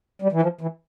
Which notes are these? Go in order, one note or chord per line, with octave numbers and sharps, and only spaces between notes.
G3
E3
F3
E3